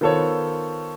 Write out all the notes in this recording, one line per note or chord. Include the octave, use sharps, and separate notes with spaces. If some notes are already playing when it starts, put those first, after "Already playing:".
D#3 B3 F4 A4 C5 C#5